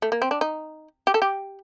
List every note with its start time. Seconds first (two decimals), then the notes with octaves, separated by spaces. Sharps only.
0.02 A3
0.12 A#3
0.22 C4
0.31 D4
0.41 D#4
1.07 G4
1.14 A4
1.22 G4